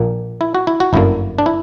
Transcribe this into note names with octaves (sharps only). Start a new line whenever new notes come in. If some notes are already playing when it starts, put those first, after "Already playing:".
Already playing: A#1 A#2 A#3
E4
F#4
E4
F#4
G1 F#2 D3 A#3 E4
D4
E4